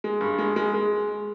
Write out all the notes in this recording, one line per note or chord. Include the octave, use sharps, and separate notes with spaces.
G#3
G2
G#3
G#3
G#3